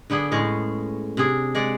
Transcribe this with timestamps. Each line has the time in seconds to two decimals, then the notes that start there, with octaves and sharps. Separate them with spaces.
0.10 D3 B3 D4 G#4
0.31 A2 G#3 C#4
1.17 C3 D4 G#4
1.55 G#3 D5 F#5